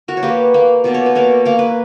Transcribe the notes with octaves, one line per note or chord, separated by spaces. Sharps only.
F#4 A#4
C#5
A#3 G4 B4
A#3
B2 D5
C#5
B4
A#3 A#4 C#5
A#3 A#4
B4